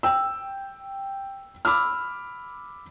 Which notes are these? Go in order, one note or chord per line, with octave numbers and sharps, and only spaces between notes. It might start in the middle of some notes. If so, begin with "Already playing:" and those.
G5 E6
B5 D6 E6 F6